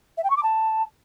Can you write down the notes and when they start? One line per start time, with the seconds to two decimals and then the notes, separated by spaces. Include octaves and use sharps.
0.17 E5
0.24 G5
0.30 C#6
0.37 D6
0.43 A5